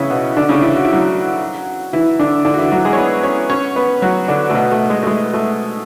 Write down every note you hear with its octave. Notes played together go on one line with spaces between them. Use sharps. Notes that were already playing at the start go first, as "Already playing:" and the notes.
Already playing: C#3 E3 B3 C#4 E4 C#5
B2 B3
D3 D4
C#3 C#4
E3 E4
F#4
E4
F#3 F#4
E3 E4
D3 D4
D3 D4
F#4
E3 E4
F#3 F#4
G#3 G#4
C#5
B3 B4
C#4 C#5
C#4 C#5
B3 B4
F#3 F#4
D3 D4
A3
B2 B3
A3
G#3
A3
G#3
A3